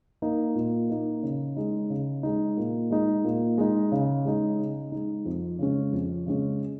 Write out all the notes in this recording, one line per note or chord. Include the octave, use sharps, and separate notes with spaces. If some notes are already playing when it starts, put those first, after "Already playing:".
A#3 D#4
A#2
A#3 D#4
C#3
G#3 D#4
C#3
G#3 D#4
A#2
G#3 D#4
A#2
G#3 D#4
C#3
G#3 D#4
C#3
G#3 D#4
F2
C#3 G#3 C#4
F2
C#3 G#3 C#4